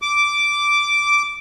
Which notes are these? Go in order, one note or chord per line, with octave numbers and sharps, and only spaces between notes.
D6